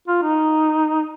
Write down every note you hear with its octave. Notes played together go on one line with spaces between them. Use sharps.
F4
D#4